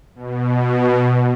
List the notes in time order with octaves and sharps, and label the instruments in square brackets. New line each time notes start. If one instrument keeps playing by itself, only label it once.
[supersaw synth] B2